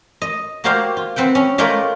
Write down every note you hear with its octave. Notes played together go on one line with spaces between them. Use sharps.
D#5
A#3 F#4 G4 C5 D5 F5
F4
C4 B4 F#5 G5
C#4
G#3 A3 F4 A#4 D5 G5